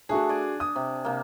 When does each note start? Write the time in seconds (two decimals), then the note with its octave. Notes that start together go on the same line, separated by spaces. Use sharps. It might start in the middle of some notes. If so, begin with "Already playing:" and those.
0.09 A3 D4 F#4 G#4
0.29 D5 G#5
0.60 D#6
0.76 C3
1.05 C3 A#3